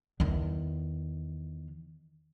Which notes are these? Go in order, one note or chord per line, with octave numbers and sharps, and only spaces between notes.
E2 D#3